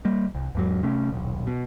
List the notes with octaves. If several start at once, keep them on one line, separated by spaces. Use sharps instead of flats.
G3 A#3
C2
E2 G#2 F#3
C3 A3 C#4
D#1 B1
B2